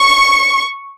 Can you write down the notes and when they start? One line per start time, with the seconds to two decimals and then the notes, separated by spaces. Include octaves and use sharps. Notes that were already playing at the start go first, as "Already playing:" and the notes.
Already playing: C#6